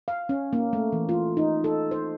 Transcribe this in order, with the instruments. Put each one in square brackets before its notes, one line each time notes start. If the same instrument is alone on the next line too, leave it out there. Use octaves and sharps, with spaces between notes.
[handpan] F5
C#4
A#3
A3
E3
F4
D#4
A4
C5